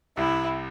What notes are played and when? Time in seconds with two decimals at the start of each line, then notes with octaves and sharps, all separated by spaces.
0.17 C2 C3 E4